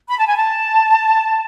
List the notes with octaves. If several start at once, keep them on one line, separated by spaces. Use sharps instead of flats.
B5
A5
G#5
A5